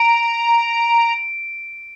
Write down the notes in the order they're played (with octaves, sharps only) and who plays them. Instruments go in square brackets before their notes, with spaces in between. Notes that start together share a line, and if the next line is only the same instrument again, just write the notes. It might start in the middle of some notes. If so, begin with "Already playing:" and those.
Already playing: [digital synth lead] A#5 [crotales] D7